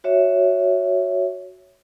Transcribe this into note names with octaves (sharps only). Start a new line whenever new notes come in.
F#4 C#5 E5